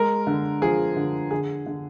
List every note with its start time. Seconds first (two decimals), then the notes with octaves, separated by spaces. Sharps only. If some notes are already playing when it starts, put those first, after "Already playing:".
Already playing: G#3 A#4
0.27 D3
0.61 F3 G#4
0.96 D3
1.31 D3 G#4
1.66 D3